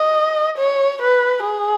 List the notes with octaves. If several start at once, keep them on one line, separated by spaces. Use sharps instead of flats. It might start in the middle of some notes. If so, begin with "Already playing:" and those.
Already playing: D#5
C#5
B4
G#4